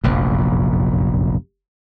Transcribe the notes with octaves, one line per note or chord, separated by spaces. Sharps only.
F1 A#1 F#2